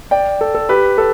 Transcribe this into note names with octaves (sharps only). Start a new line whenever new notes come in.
D5 G5
A4
A4
G4 B4
A4